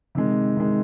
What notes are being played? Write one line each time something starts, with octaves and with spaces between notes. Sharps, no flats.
C3 D#3 G#3
C3 D#3 G#3